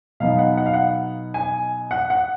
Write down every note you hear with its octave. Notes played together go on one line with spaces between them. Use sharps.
B2 F#3 B3 D#4 F5
F#5
F#5
F5
F#5
G#5
F#5
F#5